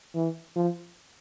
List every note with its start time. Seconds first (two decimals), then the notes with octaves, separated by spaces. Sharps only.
0.16 E3
0.56 F3